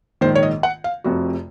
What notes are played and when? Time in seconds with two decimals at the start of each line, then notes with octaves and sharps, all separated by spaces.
0.21 A#1 G#2 D#3 C5
0.35 C#5
0.43 D#5
0.63 F#5
0.84 F5
1.04 F1 F2 C3 F#4